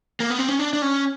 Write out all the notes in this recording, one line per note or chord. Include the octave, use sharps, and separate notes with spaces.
A#3
B3
C4
C#4
D4
D4
C#4